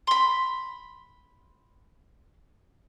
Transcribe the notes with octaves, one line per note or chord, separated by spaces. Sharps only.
B5 C6